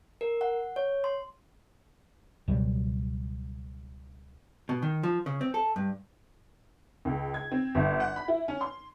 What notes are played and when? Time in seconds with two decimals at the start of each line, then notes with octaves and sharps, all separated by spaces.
0.21 A#4
0.41 F#5
0.76 C#5
1.04 C6
2.48 C#2 B2 F#3 G3
4.69 B2
4.82 D#3
5.03 F3
5.26 C#3
5.41 C4
5.54 A4
5.76 G2
7.05 C#2
7.34 G#6
7.52 C4
7.75 G1
8.00 F#5
8.16 B5
8.28 E4
8.48 C#4
8.61 C6